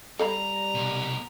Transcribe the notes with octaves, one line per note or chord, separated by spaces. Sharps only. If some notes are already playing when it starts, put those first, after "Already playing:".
G3 A4 F5 A#5 B5
C2 B2